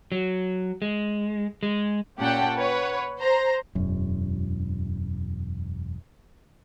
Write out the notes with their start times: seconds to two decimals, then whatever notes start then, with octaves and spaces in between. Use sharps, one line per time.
0.12 F#3
0.82 G#3
1.63 G#3
2.19 A#2 C#4 G4 F#5 G5 A5
2.57 B4 C#5 F#5
3.20 C5 A#5
3.75 E1 F#2